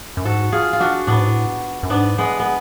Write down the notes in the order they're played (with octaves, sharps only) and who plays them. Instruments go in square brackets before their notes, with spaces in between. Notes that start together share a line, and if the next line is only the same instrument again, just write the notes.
[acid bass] F#2
[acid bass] G#2 [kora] F#4 A4
[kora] F4 G#4
F4
D4 F#4
[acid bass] A2 [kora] B3 D4
[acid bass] G#2
A2
F#2
[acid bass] G#2 [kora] B3 D4
[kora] G#3 B3
B3